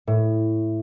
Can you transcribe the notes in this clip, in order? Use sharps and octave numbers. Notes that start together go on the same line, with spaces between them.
A2